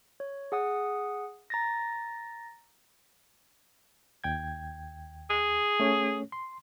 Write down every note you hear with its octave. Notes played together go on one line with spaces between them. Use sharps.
C#5
G#4 F#5 D#6
A#5 A6 A#6
D#2 G5 G#6
G#4
A3 C#4 C#5
C6